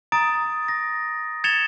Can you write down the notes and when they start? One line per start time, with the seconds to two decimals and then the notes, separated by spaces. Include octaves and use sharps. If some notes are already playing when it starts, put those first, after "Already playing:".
0.12 A#5 D#6 A6 D7
0.68 A#6
1.44 G#6 A6 C#7 E7 F7 G7